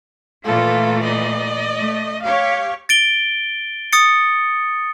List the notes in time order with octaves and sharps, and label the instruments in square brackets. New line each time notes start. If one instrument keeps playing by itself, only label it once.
[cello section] A#2 E3 A3 [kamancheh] F4 A4
[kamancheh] D5 D#5
[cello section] A3
[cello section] G4 C#5 [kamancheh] F5
[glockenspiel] A6 D7 G7
D#6 A6 C#7